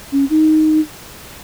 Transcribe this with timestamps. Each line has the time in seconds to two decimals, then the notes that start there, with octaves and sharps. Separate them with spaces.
0.12 C#4
0.30 D#4